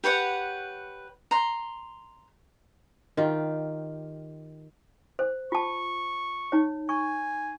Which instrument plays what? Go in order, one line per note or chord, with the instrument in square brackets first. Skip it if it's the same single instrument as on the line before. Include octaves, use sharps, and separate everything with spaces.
[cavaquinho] G4 B4 C#5 F#5
A#5 C6
[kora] D#3 F4 G4
[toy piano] C5
[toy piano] F4 A5 [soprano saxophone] C#6
[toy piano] D#4 C#5
[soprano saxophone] G#5 [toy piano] C#6